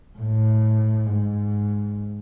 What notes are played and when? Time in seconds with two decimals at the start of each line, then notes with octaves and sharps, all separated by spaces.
0.18 A2
1.06 G#2